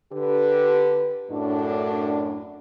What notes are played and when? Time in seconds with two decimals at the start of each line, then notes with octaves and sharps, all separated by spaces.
0.13 D3 G4 B4
1.30 F#2 A2 D4